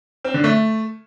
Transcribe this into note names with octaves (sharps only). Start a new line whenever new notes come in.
C4
D3
A3